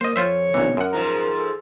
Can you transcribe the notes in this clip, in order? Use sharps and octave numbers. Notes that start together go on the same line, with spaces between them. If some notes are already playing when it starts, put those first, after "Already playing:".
A#3 C5 D#5
F2 F4 C5 C#5 E5
A#1 B2 D#3 E3 A#5
F#2 A#4 F#5
G#2 F3 A#5
A4